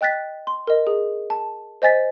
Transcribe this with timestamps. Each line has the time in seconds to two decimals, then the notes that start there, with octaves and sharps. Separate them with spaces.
0.01 D#5 G5 F#6 A6 B6
0.47 C6
0.67 A#4 D#5
0.87 G#4
1.30 A5
1.82 C5 D#5 G#5 A6 B6